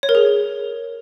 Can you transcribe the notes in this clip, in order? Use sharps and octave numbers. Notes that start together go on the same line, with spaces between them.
C#5
A#4
G#4